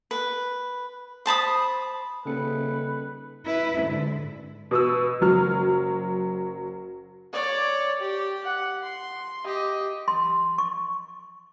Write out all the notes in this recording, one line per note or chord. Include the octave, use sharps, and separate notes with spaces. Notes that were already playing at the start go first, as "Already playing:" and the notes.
B4
C5 A5 B5 D#6
D#1 C#3 A4 B4 C#7
E4 B4
G#2 D3
B2 D#6 E6
F#1 F#3 F6
C#5 D5
G4
F#5
C6
G4 D#5
C6
C#6